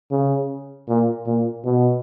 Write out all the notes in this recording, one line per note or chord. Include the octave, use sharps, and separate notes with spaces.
C#3
A#2
A#2
B2